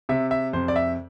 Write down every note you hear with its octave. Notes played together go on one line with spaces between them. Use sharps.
C3 E5
E5
F2 C5
D5
E5